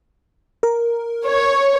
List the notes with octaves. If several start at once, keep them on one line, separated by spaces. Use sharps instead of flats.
A#4
C#5